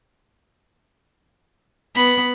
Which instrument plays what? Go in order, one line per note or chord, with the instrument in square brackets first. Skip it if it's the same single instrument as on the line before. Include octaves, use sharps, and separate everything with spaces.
[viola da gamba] B3 [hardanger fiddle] B5